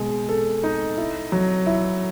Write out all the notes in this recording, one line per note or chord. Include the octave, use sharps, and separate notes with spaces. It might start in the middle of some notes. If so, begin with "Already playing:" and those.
Already playing: B2 G#3
A4
D#4
E4
F#3
E4